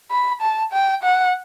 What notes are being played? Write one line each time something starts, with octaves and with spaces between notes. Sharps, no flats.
B5
A5
G5
F#5